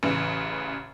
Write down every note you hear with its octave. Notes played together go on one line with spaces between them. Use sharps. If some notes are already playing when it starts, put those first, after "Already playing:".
A1 C#3 E3